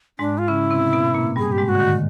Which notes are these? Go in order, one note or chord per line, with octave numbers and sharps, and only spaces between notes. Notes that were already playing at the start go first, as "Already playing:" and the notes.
G#2 G#3 D4
F4
C#3 C#4 E4
C3 C4
B2 B3
A#2 A#3
G2 G3 G#4
G4
G#2 G#3
G4
F#4
D3
D#3